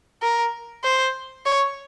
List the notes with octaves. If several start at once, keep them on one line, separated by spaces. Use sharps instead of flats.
A#4
C5
C#5